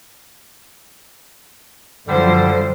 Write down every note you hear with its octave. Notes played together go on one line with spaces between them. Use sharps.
F#2 D3 F3 G3 C5